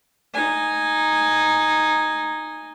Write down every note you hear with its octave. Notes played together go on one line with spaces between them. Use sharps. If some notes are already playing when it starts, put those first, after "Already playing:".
D#4 G#5